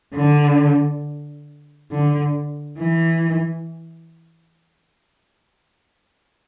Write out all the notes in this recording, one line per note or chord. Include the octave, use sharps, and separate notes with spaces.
D3
D3
E3